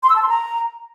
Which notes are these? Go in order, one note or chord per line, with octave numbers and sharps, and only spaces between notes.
C6
E6
A5
C6
A#5